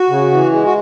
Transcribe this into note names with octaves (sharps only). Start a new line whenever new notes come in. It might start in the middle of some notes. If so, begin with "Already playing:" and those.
Already playing: F#4
C#3
E3
G#3
F#4